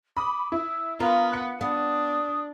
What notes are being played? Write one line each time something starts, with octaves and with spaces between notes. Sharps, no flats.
B5 D6 D#6
E4 E6
B3 F4 A#4 A#5
F#5 F#6 C#7
B3 D4 D#6